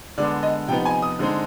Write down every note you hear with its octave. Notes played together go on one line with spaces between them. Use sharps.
D3 G#3 B3 D5
D#5
C3 F3 B3 D#4 G5
G#5
D#6
D3 G#3 C4 D#4